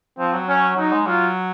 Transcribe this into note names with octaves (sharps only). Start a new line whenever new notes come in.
F3 C4
F#3
C#4
F#3 D#4
G#3
F#3 F4